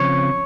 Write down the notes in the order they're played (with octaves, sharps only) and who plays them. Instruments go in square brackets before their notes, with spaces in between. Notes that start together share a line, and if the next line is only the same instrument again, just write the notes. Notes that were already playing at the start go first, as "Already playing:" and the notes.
Already playing: [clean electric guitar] C#3 F3 C4 C#5